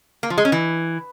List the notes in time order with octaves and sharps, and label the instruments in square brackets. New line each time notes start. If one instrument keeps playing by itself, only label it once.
[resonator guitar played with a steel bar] A#3
F3
G#3
C#4
E3